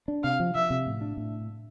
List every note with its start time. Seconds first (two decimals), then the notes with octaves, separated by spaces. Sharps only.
0.08 D4
0.24 C3 F5
0.40 F3
0.55 F3 E5
0.70 C3
0.86 A2
1.01 D4
1.17 A2